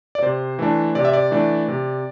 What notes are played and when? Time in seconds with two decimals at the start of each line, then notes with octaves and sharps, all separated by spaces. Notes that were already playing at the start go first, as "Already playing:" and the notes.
0.15 D5
0.22 C3 C5
0.59 E3 A3 D4
0.95 C3 D5
1.05 E5
1.13 D5
1.31 E3 A3 D4
1.68 C3